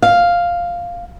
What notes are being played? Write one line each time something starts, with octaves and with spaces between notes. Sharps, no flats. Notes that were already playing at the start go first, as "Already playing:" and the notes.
F5